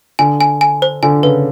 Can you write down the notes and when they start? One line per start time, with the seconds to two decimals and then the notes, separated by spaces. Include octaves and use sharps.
0.19 D3 G#5
0.40 G#5
0.61 G#5
0.82 C5
1.03 D3 G#5
1.23 C#3 B4